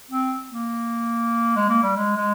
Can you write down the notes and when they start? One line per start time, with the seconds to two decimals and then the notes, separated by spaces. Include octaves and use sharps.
0.11 C4
0.51 A#3
1.56 G#3
1.69 A#3
1.83 G3
1.96 G#3
2.17 G#3